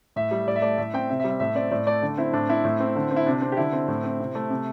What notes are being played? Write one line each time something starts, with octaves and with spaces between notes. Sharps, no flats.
A2 E5
G3
A2 D5
E5
A3 D5
A2 E5
C4 G5
C3 E5
E5
G3
E5
A2 E5
C4 D5
A2 D5
A3 D5
D3
C4 E4
A2 D4
C4 E4
A2
C4
D3
C4
E4
C3 D4
C4
G4
D3 E4
C4
A2
C4
C3
A3
C3